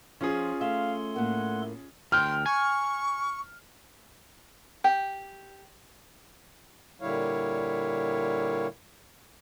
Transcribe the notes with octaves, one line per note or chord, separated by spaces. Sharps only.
F3 C#4 F4 G#4
A3 A4 E5 F5 C6
A2 A#3 F#5
D2 G5 C6 F6
G#5 C#6
G4
A#2 D3 G3 E4 C#5 F5